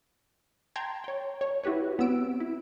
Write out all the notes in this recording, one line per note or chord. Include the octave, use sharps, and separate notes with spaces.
G5 A5 A#5 C6 G#6
C#5 G5
C#5
E4 F#4 G4 B4 C#5
B3 C4 E6 D7
E4